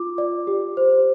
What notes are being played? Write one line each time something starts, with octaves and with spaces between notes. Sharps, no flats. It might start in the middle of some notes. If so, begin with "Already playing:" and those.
Already playing: F4 D6
D5
G4
C5